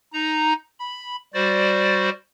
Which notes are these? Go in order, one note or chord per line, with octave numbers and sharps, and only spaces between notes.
D#4 A#5
B5
G3 F#4 C5 D5